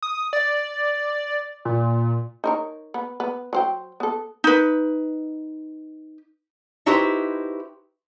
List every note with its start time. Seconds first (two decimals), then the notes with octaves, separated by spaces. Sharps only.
0.02 D#6
0.33 D5
1.65 A#2
2.44 D#4 A#4 C#5
2.94 B3
3.20 B3
3.53 F#3 C5 G5
4.00 B3 A4
4.44 D#4 B4
6.86 D#4 E4 F#4 G4 B4 C5